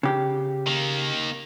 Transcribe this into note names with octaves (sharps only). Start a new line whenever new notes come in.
C#3 G4
D#3 A#3